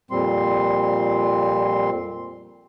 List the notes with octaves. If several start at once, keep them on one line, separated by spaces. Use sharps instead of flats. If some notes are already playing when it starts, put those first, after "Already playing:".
F2 A#2 G3 C4 C6